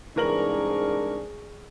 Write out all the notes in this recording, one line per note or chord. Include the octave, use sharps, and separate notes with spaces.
C2 G#2 E3 D4 G#4 A#4 C#6 F#7